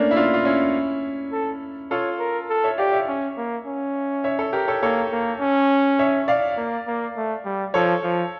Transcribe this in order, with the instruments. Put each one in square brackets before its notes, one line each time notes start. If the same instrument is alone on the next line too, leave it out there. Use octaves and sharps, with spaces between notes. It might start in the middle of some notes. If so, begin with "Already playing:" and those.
Already playing: [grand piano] A3 A#3 C#4 D4
E4
D4 F4
F4
C#4 E4
[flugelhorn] A4
[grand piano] F4 A4 [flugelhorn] C#5
[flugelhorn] A#4
A4
[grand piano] C#5 E5
[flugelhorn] G4 [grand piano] D5 F5
[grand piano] C#5 E5
[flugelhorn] C#4
A#3
C#4
[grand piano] C#5 E5
A4 C#5
G4 A#4
A4 C#5
[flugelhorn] A#3 [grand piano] A4 C#5
[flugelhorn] A#3
C#4
[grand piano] C#5 E5
D5 F5
[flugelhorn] A#3
A#3
A3
G3
[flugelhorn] F3 [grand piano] A4 C#5
[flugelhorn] F3